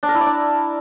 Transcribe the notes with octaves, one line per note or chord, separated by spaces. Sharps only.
D4
A#4
E4
D5
D4